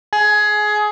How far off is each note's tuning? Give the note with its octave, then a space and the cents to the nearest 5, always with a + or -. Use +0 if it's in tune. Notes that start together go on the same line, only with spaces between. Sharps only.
G#4 +15